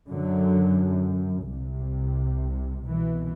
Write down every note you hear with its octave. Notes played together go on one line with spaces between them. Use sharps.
F#2 D3 F#3
C2 C3
C2 B2 E3